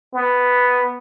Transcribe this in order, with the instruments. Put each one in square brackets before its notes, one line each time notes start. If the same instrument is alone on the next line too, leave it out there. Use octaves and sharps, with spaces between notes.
[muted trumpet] B3